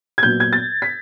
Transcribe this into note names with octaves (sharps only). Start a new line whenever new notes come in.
G#6
A#2 F#3 B3 G6
G#6
A6
B6